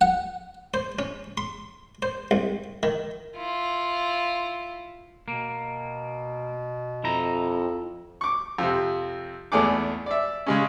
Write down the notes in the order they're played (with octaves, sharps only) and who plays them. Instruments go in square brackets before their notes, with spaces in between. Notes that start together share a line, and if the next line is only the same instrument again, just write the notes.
[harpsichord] F#5
C5
C#4
C6
C5
C2
D#3
[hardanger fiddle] E4 F4
[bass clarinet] B2 [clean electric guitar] A#3
[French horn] F2 [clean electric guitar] E4 A#5
[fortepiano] C#6 D6
F2 C3
G#1 E2 A3 G#4 D6
D5 E5
C#3 G#3 C#4